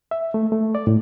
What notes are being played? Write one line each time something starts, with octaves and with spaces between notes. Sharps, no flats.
E5
A3
A3
D5
A2